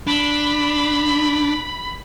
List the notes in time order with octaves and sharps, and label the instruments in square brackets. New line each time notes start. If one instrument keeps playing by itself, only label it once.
[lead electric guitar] D4 [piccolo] B5